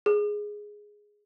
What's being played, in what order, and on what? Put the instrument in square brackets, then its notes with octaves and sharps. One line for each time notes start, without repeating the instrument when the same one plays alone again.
[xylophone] G#4